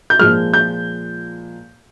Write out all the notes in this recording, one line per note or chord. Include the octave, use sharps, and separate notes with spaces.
G6
A#2 F3 G#3 F6
G6